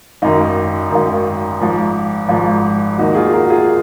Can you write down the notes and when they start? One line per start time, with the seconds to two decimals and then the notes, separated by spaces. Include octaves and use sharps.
0.22 G#1 F#2 D#3 D#4
0.90 G#1 F#2 D#3
1.60 G#1 G#2 F3
2.29 G#1 G#2 F3
2.98 D#2 D#3 D#4 F#4
3.15 F4 G#4
3.33 F#4 A#4
3.50 F4 G#4